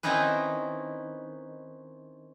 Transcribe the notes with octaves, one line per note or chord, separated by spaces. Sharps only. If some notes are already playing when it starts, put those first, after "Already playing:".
D#3 C4 C#4 D#4 E4 B4